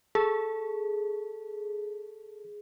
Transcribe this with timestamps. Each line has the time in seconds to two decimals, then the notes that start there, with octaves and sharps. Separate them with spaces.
0.15 G#4 A4